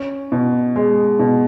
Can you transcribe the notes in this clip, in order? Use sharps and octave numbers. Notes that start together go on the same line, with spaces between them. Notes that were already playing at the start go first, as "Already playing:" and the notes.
Already playing: C#4
B2
G#3
B2